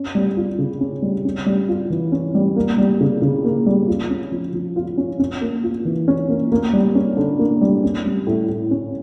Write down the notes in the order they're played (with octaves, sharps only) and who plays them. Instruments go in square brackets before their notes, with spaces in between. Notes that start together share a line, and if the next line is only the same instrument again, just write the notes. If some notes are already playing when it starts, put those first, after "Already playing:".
Already playing: [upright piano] C#4
G3
F4
C#3
C#4
G3
C#4
G3
F4
E3
C#4
G3
A#3
G3
C#3
C#3
A#3
G3
F4
C#4
F3
F3
F4
C#4
C#4
A#3
F4
E3
C#4
A#3
A#3
G3
C#4
D3
A#3
G3
C#4
G3
A2
A2
C#4